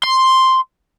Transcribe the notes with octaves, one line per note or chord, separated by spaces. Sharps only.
C6